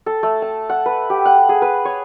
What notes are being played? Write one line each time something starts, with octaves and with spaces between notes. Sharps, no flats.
A4
A3
A5
F#5
B4
G4
F#5
G#4
B4
C#5